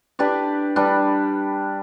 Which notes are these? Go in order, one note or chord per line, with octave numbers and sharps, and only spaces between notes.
D4 G4 B4 D5
G3 D4 B4